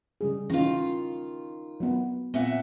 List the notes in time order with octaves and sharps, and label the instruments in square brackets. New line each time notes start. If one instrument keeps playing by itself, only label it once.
[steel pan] C#3 G3 G#4
[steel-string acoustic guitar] D#3 F4 [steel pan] E3 C#4 D#4
[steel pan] F#3 B3
[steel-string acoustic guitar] A#2 E5 F#5 [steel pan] B3 C4